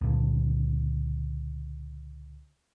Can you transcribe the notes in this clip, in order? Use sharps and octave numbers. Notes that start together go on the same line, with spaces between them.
C#2 A#2 D3